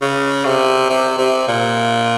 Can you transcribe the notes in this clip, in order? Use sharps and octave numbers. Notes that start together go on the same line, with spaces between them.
C#3
C3
C3
C3
A#2